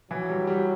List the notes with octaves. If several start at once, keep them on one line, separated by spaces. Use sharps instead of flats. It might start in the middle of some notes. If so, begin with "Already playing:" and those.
E3 F#3
G3
G3